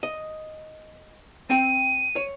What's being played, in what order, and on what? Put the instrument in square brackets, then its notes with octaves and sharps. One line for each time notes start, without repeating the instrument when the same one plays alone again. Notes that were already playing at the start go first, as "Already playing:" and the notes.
[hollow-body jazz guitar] D#5
[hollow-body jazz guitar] C4 G5 [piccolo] D#7
[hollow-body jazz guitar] C#5